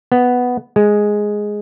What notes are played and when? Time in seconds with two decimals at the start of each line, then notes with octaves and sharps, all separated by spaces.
0.12 B3
0.76 G#3